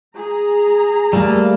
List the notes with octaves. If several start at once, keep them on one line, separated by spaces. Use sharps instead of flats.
G#4 A#5
G3 A3 A#3